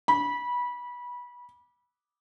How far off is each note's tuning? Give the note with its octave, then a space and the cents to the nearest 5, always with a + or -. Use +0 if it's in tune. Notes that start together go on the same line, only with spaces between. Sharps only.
B5 -20